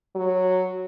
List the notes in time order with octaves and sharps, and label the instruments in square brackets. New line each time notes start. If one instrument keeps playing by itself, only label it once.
[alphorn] F#3